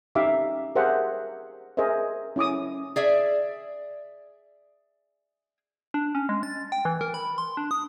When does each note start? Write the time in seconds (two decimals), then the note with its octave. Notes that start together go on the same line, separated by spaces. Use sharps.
0.15 C#4 D#4 G4 E5 F5 D6
0.75 G4 G#4 A#4 C5 E5 F#5
1.77 G#4 A#4 C5 D#5 E5
2.36 C#4 E4 D6 D#6
2.96 G#4 D5 E5
5.94 D4
6.15 C#4
6.29 G#3
6.43 A6
6.72 G5
6.85 E3
7.01 A#4
7.14 B5
7.38 C6
7.57 D4
7.71 D#6